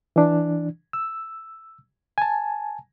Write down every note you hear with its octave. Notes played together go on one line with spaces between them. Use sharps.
E3 D4
E6
G#5 A5